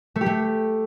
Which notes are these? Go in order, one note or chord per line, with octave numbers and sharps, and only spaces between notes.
A3
G4
A3